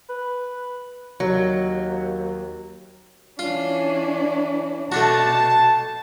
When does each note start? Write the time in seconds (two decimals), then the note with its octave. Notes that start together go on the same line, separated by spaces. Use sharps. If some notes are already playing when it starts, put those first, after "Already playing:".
0.09 B4
1.20 D#2 F#3
3.39 E3 C#4 D4 F4
4.92 B2 A3 D4 F#4 A5